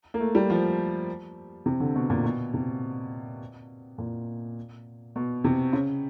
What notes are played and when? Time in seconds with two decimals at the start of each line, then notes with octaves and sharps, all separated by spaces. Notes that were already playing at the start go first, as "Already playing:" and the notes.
0.14 A#3
0.20 A3
0.35 G3
0.50 F3
1.66 C3
1.80 D3
1.95 B2
2.10 A#2
2.24 B2
2.54 C3
3.98 A#2
5.16 B2
5.44 C3
5.73 C#3